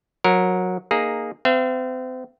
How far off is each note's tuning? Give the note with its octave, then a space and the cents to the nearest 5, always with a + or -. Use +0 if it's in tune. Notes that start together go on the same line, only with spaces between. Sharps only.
F#3 -20 A#4 +0
A#3 +0 D#4 -10 G#4 +0
C4 -35 E5 +45